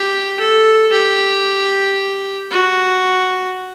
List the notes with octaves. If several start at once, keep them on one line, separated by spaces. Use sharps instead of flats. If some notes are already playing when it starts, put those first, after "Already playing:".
Already playing: G4
A4
G4
F#4